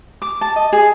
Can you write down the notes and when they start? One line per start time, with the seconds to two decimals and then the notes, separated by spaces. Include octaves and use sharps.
0.22 D6
0.41 A5
0.56 D#5
0.72 G#4